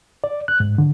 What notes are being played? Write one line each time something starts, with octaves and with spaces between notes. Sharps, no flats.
D5
F#6
G#2
D3